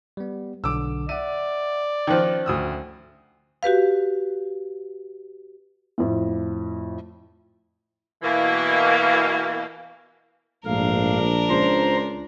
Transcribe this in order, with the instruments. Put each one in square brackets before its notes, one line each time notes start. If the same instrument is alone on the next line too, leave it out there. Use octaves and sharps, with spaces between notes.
[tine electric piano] G3 B3
[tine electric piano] B1 D3 [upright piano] D6 E6
[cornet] D5 [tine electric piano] E5 F#5 [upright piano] D#7
[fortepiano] D#3 F3 [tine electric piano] C#4 F#6
[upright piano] D2 D#6 E6
[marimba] F#4 G4 B4 F5
[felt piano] F2 A2
[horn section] B2 E3 A#3
[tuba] A#1 [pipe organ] G#2 A3 F5 [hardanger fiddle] D4 A#4
[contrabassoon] C#2 [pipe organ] C5 A#5 C6